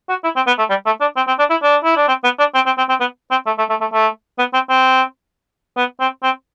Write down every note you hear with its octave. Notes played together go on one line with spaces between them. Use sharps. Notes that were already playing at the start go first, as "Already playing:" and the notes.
F#4
E4
C4
B3
A3
G3
A3
D4
C4
C4
D4
E4
D4
E4
D4
C4
B3
D4
C4
C4
C4
C4
B3
C4
A3
A3
A3
A3
A3
B3
C4
C4
B3
C4
C4